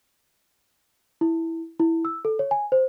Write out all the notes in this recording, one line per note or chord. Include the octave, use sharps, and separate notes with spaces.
E4
E4
E6
A4
C#5
G#5
C5